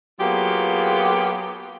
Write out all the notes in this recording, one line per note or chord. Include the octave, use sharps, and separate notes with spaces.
F#3 A#3 B3 F4 G4 G#4